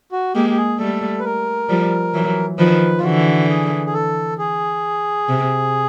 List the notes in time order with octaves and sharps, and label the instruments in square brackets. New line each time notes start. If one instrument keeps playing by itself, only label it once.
[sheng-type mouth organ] F#4
[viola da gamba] G#3 A#3 [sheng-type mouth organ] G4
[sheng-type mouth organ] G4
G#4
[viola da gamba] G3 A3 [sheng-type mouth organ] A4
[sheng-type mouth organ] B4
A#4
[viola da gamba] F3 G3
E3 F#3
[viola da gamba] D#3 F3 [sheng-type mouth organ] B4
[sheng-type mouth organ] F4
[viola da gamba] D3 E3 [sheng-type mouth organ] F#4
[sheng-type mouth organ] G#4
G#4
A4
G#4
[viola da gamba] C3